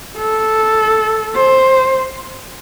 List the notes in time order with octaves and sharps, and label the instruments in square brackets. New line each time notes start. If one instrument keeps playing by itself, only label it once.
[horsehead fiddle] A4
C5